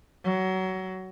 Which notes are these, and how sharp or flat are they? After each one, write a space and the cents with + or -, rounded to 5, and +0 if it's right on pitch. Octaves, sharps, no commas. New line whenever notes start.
F#3 +20